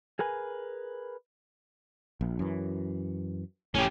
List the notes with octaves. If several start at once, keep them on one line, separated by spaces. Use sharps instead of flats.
G#4 A#4 B4 G#5
A#1
F#2 E3
F1 A2 C#4 G4